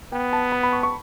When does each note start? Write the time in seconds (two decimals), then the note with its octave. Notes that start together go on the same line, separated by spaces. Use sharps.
0.12 B3 G5
0.33 A5
0.52 B5
0.63 B5
0.73 C#6
0.83 C#6